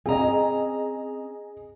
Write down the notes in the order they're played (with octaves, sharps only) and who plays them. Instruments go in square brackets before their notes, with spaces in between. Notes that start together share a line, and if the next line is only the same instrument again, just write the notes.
[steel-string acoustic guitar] C4 C#4 A#5 [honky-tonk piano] G#4 D#5